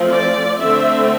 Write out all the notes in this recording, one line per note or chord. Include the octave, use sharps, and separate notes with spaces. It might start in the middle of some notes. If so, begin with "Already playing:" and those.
Already playing: F3 A3 C4
D5
D3 A3 C4 E5